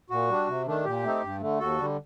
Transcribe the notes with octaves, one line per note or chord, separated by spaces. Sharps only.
A#2 F#4
G3 D4
C3
D#3 A3 D4
A#2 G4
A3 C4 D#4
G2
D3 A3
D#2 F#4 A4
D3 G3